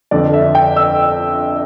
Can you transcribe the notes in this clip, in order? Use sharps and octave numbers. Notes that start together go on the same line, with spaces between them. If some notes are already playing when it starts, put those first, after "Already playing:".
G1 F2 D3 D5
E5
G5
E6